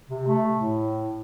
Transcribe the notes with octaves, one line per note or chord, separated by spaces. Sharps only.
C3
A3
A2